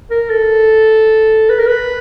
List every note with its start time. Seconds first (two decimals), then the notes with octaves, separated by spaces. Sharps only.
0.11 A#4
0.30 A4
1.50 B4
1.59 A#4
1.67 B4